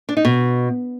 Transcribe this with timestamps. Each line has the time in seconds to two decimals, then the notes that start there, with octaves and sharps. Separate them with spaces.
0.09 D4
0.17 D#4
0.25 B2